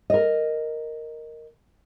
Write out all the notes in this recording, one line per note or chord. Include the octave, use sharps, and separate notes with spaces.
A#4 D#5